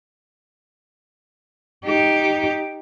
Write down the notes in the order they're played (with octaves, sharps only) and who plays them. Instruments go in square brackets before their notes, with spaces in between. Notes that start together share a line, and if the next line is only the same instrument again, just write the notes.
[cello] D#4 G4